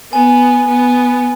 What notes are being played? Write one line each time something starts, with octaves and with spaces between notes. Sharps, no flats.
B3 G#5
B3